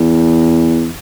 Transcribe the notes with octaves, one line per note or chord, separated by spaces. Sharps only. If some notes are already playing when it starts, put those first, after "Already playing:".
Already playing: E2